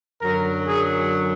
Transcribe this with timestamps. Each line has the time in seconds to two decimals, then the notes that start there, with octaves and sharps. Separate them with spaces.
0.22 F#2 D3 F#3 A#4
0.68 G#4